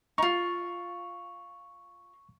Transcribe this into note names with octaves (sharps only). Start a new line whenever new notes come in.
D#4 F4 C#6